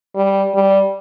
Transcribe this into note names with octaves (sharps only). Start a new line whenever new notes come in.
G3
G3